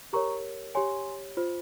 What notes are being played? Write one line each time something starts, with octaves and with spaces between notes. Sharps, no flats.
G4 A#4 C#5 A#5 C#6
G4 C#5 G#5 C6
F4 C5